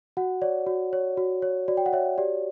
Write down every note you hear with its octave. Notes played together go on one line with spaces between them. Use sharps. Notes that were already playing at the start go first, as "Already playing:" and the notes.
F#4 F#5
C#5 D5
F#4
C#5
F#4
C#5
F#4 D5
G5
F#5
C#5 E5
G4 D5